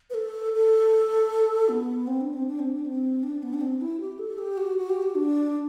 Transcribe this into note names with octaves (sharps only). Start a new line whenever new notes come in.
B4
A4
A4
B3
C4
D4
C4
D4
C4
D4
C4
D4
B3
D4
C4
E4
G4
A4
G4
F#4
F#4
G4
F#4
D4